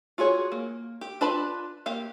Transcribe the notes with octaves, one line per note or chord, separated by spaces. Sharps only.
F4 F#4 G#4 C#5
A#3
G4
D4 F4 B4 A5 B5
A#3 G4 F5